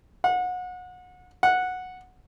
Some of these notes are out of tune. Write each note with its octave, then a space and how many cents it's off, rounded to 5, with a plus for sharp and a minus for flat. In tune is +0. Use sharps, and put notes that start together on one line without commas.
F#5 -30
F#5 -10